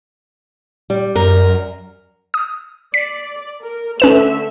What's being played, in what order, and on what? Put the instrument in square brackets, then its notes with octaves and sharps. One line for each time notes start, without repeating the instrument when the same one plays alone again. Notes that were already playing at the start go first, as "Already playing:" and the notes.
[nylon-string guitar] G3
[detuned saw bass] F#2 [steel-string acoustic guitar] A#4
[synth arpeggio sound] D#6
[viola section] D5 [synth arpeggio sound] B6
[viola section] A#4
[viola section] D3 A3 E5 [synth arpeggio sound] C#4 B4 E7